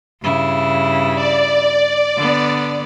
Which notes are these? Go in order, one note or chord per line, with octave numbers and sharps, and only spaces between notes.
G2 C#3 E4
D5
D3 B3